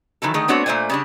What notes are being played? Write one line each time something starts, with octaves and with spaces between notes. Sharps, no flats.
D#3 E3 F#3 A4
D3 D#3 A3 G#4
A3 B3 C4 D4 F#4 C#5
A#2 A3 C5 D5 G#5
C#3 G3 D4